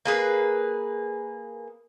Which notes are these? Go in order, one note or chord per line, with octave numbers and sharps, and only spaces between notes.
A#3 G#4 B4